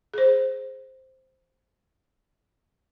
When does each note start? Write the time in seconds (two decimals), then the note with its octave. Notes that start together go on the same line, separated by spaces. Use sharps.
0.14 G#4 C5